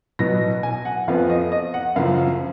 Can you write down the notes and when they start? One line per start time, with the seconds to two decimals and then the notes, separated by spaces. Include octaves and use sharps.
0.19 B2 F#3 B3 A#6
0.63 G#5
0.85 F#5
1.08 F2 F3 B3 F5
1.30 D#5
1.52 D#5
1.74 F#5
1.96 F#2 C#3 F3 F5